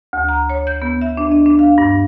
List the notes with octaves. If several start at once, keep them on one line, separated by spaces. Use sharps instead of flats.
D2
A#5
C#5
G6
B3
E5
D4
D#5
D4
F5
G2